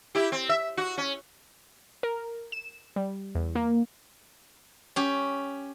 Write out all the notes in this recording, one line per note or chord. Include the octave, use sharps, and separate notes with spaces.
E4 G4
C4
E5
F#4
C#4
A#4
E7
G3
E2
A#3
C#4 G4